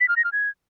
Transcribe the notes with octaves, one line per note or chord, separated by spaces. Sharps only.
B6
F6
A#6
F6
G#6